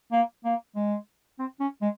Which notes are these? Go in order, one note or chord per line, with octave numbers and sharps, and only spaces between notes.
A#3
A#3
G#3
C4
C#4
G#3